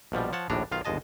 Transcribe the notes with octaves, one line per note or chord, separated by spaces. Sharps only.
A#1 B2 F3 G3
F3 C#5 F#5 A5
A#1 D#2 A2 D4 A#5
B1 D#3 F4 F5
G1 D#2 G#3 D#5 A5